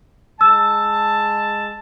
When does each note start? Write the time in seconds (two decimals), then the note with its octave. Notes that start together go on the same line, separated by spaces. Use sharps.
0.41 G#3 A5 E6